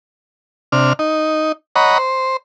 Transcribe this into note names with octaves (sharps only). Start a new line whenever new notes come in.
C3 D4 F6
D#4
C#5 D#5 F#5 A#5 B5
C5